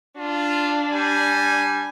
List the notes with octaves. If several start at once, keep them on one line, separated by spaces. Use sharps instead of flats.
D4 F4
G3 G#5